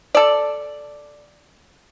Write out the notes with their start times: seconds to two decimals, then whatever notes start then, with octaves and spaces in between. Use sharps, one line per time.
0.15 A4 D5